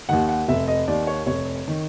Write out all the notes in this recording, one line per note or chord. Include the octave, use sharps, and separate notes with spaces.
D#2 D#3 F#5
F#5
F1 E5
D#5
D#2 D#3 D5
C#5
F1 C#5
D#3